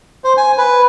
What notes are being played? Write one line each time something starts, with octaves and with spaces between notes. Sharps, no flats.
C5
G#5
B4